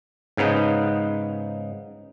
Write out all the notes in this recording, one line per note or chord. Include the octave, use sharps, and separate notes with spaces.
G#2 C#3 B3 D#4